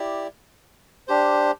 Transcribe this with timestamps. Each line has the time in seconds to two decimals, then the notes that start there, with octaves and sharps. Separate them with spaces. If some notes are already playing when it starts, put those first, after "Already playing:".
Already playing: E4 G4 D5
1.08 D4 G4 C5